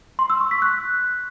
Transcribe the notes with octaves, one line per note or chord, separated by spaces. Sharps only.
C6
E6
C#6
B6
F#6